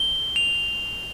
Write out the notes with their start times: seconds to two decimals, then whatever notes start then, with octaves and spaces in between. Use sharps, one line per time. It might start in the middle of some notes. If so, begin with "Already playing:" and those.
Already playing: G7
0.36 F7